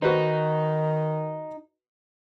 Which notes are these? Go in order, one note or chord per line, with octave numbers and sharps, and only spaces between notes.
D#3 D#4 F#4 B4 C5